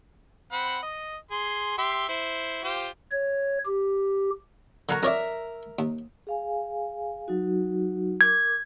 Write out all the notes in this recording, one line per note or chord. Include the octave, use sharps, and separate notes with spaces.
C4 F#5 B5
D#5
G#4 C6
G4 E5 C6
E4 C5
F4 G4 C5
C#5
G4
D3 F#3 F#4 A#4 F5 A#5
F2 A#4 C#5 D5 E5
D#2
G#4 F5 G#5
F#3 D#4 F#4
A#4 D6 G#6